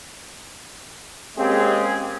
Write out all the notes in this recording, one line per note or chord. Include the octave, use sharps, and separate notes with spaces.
G#3 A#3 C4 C#4 G4 G#4